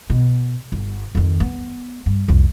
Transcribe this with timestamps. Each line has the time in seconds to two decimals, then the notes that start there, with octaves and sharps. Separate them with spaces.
0.10 B2
0.72 G1
1.15 F2 D#3
1.40 B3
2.06 G2
2.28 C2 F2